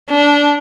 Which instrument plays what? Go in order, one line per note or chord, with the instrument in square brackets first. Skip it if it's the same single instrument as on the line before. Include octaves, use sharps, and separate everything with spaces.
[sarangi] D4